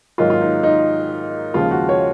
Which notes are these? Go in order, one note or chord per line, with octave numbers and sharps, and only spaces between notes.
G#2 D#3 F#3 A#3 F4
F4
D#4
D#4
D#2 C#3 F3 G#3 F4
F#4
C#5